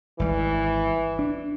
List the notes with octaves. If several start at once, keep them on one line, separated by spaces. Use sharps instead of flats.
G#1 E3 G3
D4